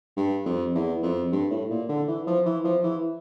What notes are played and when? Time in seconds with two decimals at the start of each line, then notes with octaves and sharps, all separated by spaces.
0.17 G2
0.46 F2
0.75 E2
1.03 F2
1.32 G2
1.51 A2
1.70 A#2
1.89 D3
2.08 E3
2.27 F3
2.46 E3
2.64 F3
2.83 E3